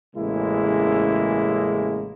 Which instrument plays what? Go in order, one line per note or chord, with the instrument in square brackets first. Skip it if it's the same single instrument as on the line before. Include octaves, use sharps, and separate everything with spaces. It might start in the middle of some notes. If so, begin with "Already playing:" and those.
[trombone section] A1 C#3 G#3 A#3 E4